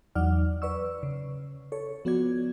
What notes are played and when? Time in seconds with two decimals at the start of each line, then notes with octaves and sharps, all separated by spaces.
0.15 E2 F#3 D#4 D5 F#5 F6
0.62 B4 D5 C#6 E6
1.03 C#3
1.72 A4 C#5
2.05 F3 B3 F#4 D5 G#6